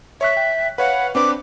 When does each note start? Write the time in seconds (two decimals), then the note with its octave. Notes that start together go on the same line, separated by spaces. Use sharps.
0.21 C#5 E5 C#6 F#6
0.37 G5
0.78 B4 C#5 F5 F#5
1.15 C4 D4 B4 D6